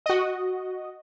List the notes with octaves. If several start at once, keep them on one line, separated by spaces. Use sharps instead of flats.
F#4 D#5